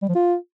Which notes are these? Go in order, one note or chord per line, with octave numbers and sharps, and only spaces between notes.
G3
F3
F4